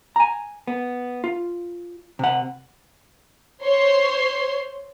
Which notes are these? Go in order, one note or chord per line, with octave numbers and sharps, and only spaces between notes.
G#5 A#5
B3
F4
C3 F#5
C5 C#5 C6